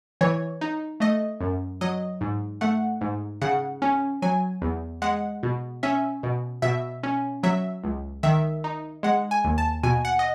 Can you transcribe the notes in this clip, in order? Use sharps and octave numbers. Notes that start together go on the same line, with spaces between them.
E3 C#5
D#4
A3 D#5
F#2
F#3 D#5
G#2
A3 F#5
G#2
C#3 F#5
C#4
F#3 G#5
E2
G#3 F#5
B2
C#4 E5
B2
B2 E5
C#4
F#3 E5
C#2
D#3 E5
D#4
G#3 F#5
G#5
D#2
A5
B2 G#5
F#5
D#5